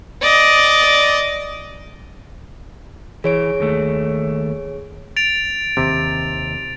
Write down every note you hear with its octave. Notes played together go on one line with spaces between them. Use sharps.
D5 D#5
E3 G#4 C#5 D7
D#2 A3
A6 D7 F7
D#2 C3 D#3